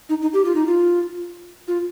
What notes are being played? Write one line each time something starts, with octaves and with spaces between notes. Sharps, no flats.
D#4
D#4
G4
F4
D#4
F4
F4